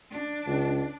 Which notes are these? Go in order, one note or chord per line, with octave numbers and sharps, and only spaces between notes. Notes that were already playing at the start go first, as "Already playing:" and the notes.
D4
C#2